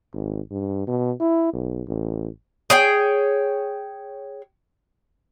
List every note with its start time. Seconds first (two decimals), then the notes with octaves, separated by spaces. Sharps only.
0.14 G#1
0.51 G2
0.87 B2
1.20 E4
1.53 B1
1.88 A1
2.70 G#4 C#5 G5